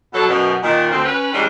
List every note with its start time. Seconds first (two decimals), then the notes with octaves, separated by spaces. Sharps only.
0.13 B2 F#3 A4
0.28 F#2 B2
0.63 A#2 D#3
0.91 D2 C4
1.04 C#4 B4
1.32 D#3 E3 G3 G#3 C#4 D4